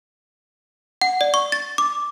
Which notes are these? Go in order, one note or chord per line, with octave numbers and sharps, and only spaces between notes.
F#5
D5
C#6
A6
D6